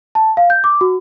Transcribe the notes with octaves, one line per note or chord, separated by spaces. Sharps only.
A5
F5
G6
D6
F#4